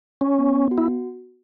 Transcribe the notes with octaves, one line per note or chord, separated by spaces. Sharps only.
C#4 C#5
B3
B3
F#4
E4